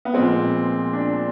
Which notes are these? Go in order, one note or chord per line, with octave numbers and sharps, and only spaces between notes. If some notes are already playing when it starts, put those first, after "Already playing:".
B3
A#2 F3 G#3 C4
D4